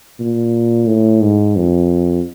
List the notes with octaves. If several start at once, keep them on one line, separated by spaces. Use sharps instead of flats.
A#2
A2
G#2
F2